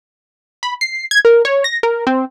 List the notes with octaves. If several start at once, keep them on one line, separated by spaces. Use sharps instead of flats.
B5
C7
G#6
A#4
C#5
A#6
A#4
C4